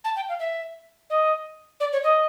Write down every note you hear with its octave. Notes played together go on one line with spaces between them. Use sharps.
A5
G5
F5
E5
D#5
D5
C#5
D#5